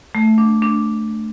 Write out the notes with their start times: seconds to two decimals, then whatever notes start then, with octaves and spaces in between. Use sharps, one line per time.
0.15 A3
0.38 D4
0.62 D4